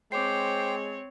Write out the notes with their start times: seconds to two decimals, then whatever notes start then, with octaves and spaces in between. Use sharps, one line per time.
0.12 G#3 C4 C5 C#5 G5 D6 C7